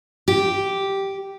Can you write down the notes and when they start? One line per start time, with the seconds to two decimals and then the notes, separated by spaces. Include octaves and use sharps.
0.28 G4